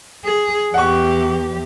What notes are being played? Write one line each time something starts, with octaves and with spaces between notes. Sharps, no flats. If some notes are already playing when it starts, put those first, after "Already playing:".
G#4
E2 G4 F#5 C#6